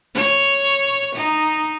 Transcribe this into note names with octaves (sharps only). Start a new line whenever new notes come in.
C#5
D#4